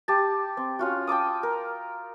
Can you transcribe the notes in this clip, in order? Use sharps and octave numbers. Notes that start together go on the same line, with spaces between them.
G4 A5
C4
C#4 F4 F#4
G5 A5 D6 D#6
A#4